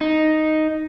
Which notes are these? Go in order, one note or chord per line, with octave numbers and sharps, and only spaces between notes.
D#4